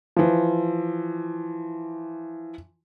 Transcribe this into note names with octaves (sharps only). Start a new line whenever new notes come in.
E3 F3